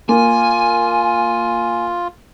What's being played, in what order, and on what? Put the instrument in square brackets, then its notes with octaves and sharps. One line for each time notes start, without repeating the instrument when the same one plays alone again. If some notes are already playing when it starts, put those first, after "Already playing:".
[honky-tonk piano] A#3 [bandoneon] F4 [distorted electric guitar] G#5